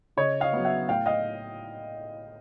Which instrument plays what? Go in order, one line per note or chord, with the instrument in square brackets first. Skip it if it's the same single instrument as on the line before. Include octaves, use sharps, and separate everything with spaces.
[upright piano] C#3 C#5 D#5
D#5 F5
F#3 B3
E5 F#5
A2 F5 G5
D#5 F5